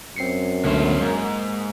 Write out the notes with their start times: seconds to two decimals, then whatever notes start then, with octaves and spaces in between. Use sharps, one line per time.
0.16 F#2 C4 C7 C#7
0.64 C#2 B2 D3 A3 C5
1.01 G#2 A#3